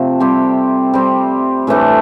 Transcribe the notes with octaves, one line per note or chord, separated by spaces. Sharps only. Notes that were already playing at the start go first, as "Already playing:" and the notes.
Already playing: C3 F3 A3
G3 C4 G4
G3 C4 G4
A2 E3 A3 D4